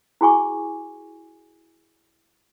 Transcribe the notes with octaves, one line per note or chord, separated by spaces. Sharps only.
E4 F#4 G#4 G#5 C#6 D6